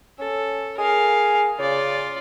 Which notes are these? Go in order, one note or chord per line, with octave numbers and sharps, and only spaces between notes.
C#4 A4
G#4 A#4 F5
C#3 F4 D5